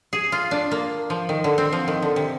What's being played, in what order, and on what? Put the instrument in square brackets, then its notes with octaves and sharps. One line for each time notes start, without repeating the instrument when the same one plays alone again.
[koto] G#4
F4
D4
A#3
F3
D#3
D3
C4
F3
D#3
D3
C3